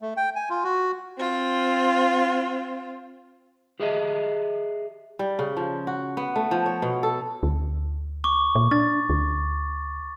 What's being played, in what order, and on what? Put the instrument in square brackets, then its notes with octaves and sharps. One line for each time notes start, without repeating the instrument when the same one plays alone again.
[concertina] A3
G5
G#5
F4
F#4
[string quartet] C4 F4
[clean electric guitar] G4 G#4 D#5 E5
[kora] G3
C#3
F3
F#4
B3
A3
F3
C#5
B2
A4
[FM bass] D2
[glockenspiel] C#6 D6
[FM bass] A#2
[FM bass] D4 [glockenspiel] A6
[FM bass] D2